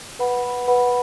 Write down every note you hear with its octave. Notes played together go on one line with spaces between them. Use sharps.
B4 F#5 B5
B4 F#5 B5